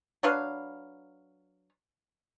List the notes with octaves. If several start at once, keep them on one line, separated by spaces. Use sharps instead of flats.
F#3 D4 B4 F5